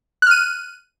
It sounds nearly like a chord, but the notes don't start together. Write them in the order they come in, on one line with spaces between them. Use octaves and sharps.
F#6 F6 D#7